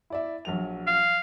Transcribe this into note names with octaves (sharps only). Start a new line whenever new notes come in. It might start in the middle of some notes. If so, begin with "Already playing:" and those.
E4 D5 E5
A#1 F#3 F7
F5